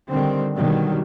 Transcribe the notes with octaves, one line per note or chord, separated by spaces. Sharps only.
D3 D#3 G3 C4
B2 D3 D#3 F#3 G3